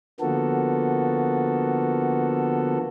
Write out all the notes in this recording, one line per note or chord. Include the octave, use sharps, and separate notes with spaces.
D3 F3 A#3 B3 F#4 A4